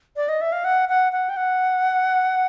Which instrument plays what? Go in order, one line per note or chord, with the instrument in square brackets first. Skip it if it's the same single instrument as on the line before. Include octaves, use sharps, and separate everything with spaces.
[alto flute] D5
D#5
E5
F5
F#5
F#5
F#5
G5
F#5